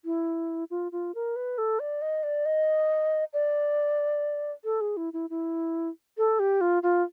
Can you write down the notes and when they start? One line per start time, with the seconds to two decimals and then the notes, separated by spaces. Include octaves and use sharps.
0.05 E4
0.71 F4
0.92 F4
1.15 A#4
1.36 B4
1.58 A4
1.80 D5
2.02 D#5
2.23 D5
2.46 D#5
3.33 D5
4.64 A4
4.81 G#4
4.97 E4
5.13 E4
5.30 E4
6.18 A4
6.39 G4
6.61 F4
6.83 F4